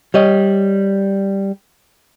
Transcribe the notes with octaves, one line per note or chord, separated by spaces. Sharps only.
G3 C#5 D#5